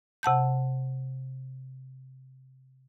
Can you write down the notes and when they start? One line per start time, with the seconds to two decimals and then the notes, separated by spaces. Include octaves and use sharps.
0.23 C3 F#5 A5 G6